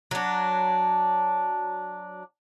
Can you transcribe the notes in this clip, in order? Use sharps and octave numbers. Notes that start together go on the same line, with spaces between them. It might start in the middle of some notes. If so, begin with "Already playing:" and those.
F#3 D4